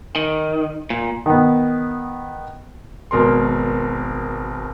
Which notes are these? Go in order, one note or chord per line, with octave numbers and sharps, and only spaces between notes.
D#3
A#2
D#3 B3
G#1 B2 A#4 C6